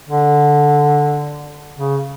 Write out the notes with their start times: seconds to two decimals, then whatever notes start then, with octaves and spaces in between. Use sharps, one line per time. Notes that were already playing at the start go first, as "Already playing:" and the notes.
0.09 D3
1.77 C#3